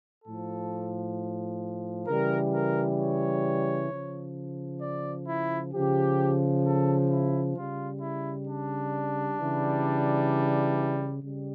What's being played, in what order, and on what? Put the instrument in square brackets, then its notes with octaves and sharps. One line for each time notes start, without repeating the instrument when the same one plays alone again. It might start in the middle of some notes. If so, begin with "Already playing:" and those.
[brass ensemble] A2 F3 A4
C#3 E3 G3 A#4
A#4
C#5
C#3 F3
D5
E4
C#3 F3 G4
A4
E4
C#3 G3 F4
E4
D4
C#3 E3 G3
C#3 G3